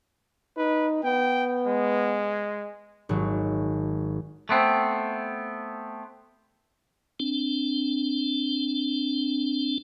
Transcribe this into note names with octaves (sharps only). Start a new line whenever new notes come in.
D#4 B4
B3 G5
G#3
G#1 F#3
A3 B3 C4
C4 D4